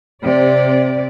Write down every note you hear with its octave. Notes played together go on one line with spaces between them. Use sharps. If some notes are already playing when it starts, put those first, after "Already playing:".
C3 D5